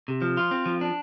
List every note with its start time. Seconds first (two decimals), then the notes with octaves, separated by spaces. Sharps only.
0.08 C3
0.22 F3
0.37 F4
0.51 C4
0.66 F3
0.81 D4